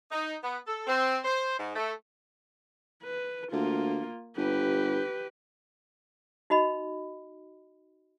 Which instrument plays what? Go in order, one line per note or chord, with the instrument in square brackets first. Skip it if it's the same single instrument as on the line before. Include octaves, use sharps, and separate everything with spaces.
[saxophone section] D#4
B3
A4
C4
C5
G#2
A3
[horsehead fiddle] B4
[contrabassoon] D2 [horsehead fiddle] A#3 F4
[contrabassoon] G1 [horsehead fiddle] G4 B4
[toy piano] D#4 F#4 D#5 B5